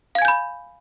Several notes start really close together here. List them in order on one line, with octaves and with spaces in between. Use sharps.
F5 G#6 G#5 G6 B5